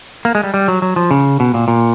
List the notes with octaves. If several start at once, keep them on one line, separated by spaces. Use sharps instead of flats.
A#3
G#3
G3
G3
F#3
F#3
F3
C#3
B2
A#2
A#2